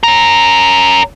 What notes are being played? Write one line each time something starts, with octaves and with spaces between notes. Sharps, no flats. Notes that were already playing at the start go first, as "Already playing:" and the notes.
C#4 A#4